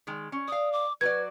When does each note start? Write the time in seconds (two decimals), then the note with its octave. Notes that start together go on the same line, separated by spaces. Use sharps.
0.07 D#3 G#3
0.32 C#4
0.48 D5 F5 D#6
0.73 D6
1.01 F#3 F#4 B4 D5 G#6